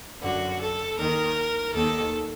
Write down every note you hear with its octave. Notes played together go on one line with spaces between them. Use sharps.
F#2 D3 F#4
A4
D#2 D#3 A#4
D#2 D#3 A4